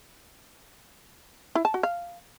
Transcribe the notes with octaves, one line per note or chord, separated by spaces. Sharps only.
E4
A5
F#4
F5